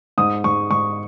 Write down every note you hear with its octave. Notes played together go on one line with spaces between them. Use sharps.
G#2 D#6
G#2 C#6
G#2 C#6